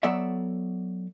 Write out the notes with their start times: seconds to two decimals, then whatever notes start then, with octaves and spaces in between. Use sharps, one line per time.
0.03 F#3 B3 A4 C#5 D5 E5